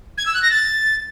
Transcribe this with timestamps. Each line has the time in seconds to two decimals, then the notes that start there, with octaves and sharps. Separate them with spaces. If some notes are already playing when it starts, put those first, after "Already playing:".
0.18 G#6
0.26 E6
0.34 F#6
0.43 A#6
0.51 A6